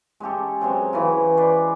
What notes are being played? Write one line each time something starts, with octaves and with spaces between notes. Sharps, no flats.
G#3 C#4 G4 A4
F#3 G#3 C4
C#3 E3
B4 C5 D5